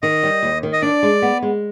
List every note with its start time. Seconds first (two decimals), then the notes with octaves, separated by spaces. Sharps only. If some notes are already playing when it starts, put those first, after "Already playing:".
0.03 D#3 D#5
0.23 G3
0.43 D#2
0.63 D#3
0.73 D#5
0.82 D4 D5
1.03 G#3
1.22 B3
1.42 G#3